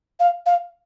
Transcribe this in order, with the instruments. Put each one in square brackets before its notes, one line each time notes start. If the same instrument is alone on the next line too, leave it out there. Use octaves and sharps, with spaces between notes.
[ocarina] F5
F5